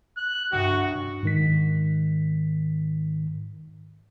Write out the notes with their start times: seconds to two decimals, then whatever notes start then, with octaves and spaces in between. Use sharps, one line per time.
0.17 F#6
0.52 C2 G2 F#4
1.23 G#2 D#3 B6